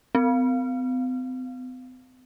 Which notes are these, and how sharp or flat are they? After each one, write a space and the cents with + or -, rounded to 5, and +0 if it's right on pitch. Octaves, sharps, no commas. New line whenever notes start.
C4 -45